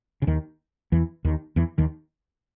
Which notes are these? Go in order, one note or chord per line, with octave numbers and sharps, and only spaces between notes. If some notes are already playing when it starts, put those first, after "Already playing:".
C#3
D#2 D#3
E2 E3
D#2 D#3
E2 E3
D#2 D#3